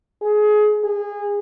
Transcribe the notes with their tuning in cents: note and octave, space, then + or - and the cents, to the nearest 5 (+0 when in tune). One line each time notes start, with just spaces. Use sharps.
G#4 +25
G#4 -25